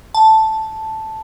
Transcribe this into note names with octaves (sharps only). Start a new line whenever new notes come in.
A5